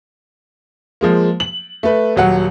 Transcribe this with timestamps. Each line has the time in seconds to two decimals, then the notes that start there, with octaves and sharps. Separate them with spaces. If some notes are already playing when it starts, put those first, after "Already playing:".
1.01 F3 G#3 A#3
1.40 F#7
1.83 A3 B4
2.16 D#1 F#3 F#5